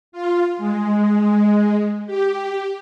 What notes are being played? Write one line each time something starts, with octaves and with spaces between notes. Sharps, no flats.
F4
G#3
G4